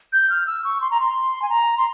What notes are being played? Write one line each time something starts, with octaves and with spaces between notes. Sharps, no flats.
G6
F6
E6
C#6
C6
A#5
C6
G#5
A#5
C6